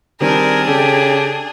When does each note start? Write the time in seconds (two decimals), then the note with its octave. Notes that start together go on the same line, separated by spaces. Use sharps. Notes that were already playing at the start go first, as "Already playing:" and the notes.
0.20 D#3 G3 C4 D4 G#4 A#4
0.67 C#3 G4 A4